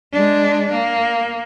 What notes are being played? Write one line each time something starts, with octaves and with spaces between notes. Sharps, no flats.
G#3 D4
A#3